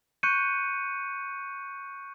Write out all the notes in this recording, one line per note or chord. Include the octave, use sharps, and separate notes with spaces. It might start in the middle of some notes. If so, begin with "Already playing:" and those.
C#6 F#6 G6 C#7 D#7